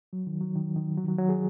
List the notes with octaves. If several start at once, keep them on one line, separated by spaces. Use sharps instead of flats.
F#3
D#3
F#3
D#3
D#3
F#3
D#3
F#3
F#3
G#4